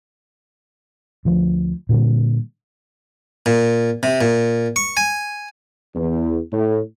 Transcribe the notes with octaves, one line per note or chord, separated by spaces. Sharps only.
D2 F3
A#2 D3 G3
A#2
C3
A#2
C#6
G#5
E2
A2